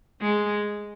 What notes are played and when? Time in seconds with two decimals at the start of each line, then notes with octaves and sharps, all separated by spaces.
0.21 G#3